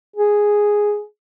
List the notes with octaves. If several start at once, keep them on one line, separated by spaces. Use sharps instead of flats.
G#4